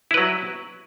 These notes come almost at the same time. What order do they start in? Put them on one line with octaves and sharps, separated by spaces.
E4 B4 F#3